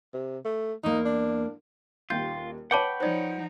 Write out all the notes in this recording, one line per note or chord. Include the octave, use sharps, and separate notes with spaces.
C3
A3
E2 A#3 D#4
D4
D#1 D#2 F4 G5 G6
B4 C#5 F#5 G5 A5 B5 D6 G6
F3 D#4 C5 D5